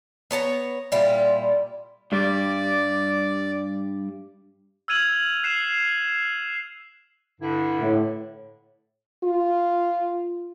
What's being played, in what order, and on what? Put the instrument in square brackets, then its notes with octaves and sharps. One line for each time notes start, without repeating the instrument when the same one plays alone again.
[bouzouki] B3 C#5 A5 A#5
A#2 G3 E4 F4
[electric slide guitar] G2 G3 [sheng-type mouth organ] D5
[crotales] E6 F6 G#6 D#7 F7 F#7
F#6 C7 E7
[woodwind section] G2 D3 E4
[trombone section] A2
[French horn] F4